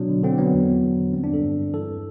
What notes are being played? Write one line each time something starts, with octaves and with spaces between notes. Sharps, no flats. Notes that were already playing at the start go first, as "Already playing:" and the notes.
Already playing: B2 F#3 D4
D3
D3 C4
F#3 B3
E2
E2
E2
D3
G3 C4
D4
G2 A4
G2
G2
E3 A4